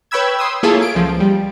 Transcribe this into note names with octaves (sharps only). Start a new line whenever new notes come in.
B4 C#5 G5 B5 E6 G#6
C6 D#6 E6
A#3 E4 F4 G#4 A4 C#5
D7
C#2 F3
G3